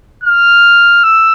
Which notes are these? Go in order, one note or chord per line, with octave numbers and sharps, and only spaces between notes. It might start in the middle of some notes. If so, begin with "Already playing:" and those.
F6
E6